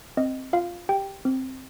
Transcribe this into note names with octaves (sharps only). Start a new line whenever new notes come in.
C4 D#5
F4 F5
G4 G5
C4